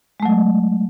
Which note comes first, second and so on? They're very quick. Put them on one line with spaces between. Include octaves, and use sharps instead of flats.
G#3 A3 F#3